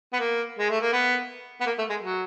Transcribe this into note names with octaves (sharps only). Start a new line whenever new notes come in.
B3
A#3
G#3
A3
A#3
B3
B3
A#3
A3
G#3
F#3